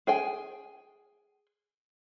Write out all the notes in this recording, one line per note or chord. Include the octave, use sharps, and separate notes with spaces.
G#4 G5 G#5